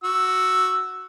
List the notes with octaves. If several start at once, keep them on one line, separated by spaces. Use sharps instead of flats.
F#4 E6